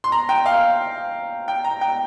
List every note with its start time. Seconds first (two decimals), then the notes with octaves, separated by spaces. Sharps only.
0.04 C6
0.12 A#5
0.29 G5
0.46 F5
1.48 G5
1.64 A#5
1.81 G5